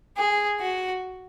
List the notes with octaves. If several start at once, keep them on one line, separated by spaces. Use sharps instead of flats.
G#4
F#4